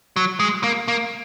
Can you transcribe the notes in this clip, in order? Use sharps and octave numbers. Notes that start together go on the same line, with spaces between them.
F#3
G#3
A#3
A#3